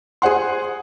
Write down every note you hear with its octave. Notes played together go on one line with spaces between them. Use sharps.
G#4 C5 F#5 C6